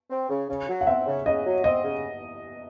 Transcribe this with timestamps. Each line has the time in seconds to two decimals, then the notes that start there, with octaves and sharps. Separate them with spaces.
0.10 C4
0.29 C#3
0.49 C#3
0.68 F#3
0.81 F#5
0.87 C4 E5
1.07 C#3
1.26 C#3 D#5
1.45 F#3
1.64 C4 D#5
1.83 C#3